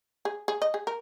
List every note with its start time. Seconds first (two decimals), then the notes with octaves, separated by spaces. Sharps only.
0.25 G#4
0.48 G#4
0.62 D#5
0.74 G#4
0.87 A#4